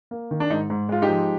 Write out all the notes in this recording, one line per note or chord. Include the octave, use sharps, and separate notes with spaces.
A#3
D#3
D4
G#2 D#4
G#2
G#3 F4
D#4 G4
F3